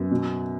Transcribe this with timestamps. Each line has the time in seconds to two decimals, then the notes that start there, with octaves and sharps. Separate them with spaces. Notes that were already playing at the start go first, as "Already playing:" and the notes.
Already playing: F#2 B3
0.11 B2